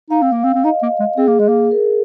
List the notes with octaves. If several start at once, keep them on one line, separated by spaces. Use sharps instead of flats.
D#4 F5
C4
A#3
C4
C4
D#4 D#5
A#3
G#3
C4 G#4
A#3
G#3
A#3
A#4